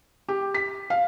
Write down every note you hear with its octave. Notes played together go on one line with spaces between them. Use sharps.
G4
B6
F5